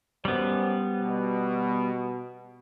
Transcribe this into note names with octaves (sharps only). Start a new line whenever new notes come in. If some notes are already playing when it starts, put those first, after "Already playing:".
F#2 G3 B3 C5
B2